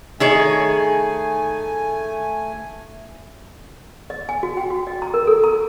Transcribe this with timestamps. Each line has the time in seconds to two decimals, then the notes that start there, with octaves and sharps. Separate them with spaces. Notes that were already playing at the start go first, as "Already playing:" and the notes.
0.20 D#3 A3 G#4 C#5 G#5
4.10 D#5
4.29 G#5
4.43 F#4
4.57 G5
4.70 F#4
4.87 D#5
5.02 A#5
5.14 A#4
5.27 A4
5.44 A#5